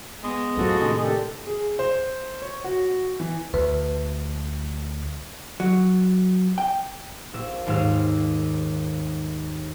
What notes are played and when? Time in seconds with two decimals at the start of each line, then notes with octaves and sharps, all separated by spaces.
0.24 G#3 B3
0.57 F#2 A2 F3 F#4 A4
0.79 A2 C3 D#3 D4
1.03 D4 G4 A4 A#4
1.47 G#4
1.79 C5
2.42 C#5
2.64 F#4
3.20 E3
3.54 D2 B4
5.60 F#3
6.58 G5
7.33 A#1 E6
7.67 D#2 G#2 C6 E6 F6